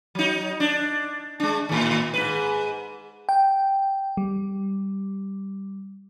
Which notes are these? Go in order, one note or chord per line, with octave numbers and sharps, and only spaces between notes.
F#3 D#4
D4
G#3 D4
A2 D#3
G#2 B4
G5
G3